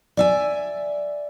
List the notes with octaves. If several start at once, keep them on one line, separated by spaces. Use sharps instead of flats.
D5 E5 G#5